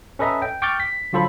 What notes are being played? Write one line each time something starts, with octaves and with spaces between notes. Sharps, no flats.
C#4 A4 B4 D#5 E5 A#5
G5
G5 C#6 D6 F6 G6 A6
B6
D3 F#3 F4 A4 C5 B5